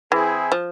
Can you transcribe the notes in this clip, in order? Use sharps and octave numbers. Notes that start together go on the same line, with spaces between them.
E3 C4 E4 G#4
F3